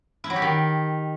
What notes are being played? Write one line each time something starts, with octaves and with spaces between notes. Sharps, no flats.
E4
F#3
G4
D#3